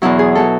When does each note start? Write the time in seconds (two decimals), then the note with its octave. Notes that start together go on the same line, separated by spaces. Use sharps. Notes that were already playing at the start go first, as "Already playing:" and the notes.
0.02 E2 B2 F#3 E4
0.19 G#4
0.35 B2 F#3 A4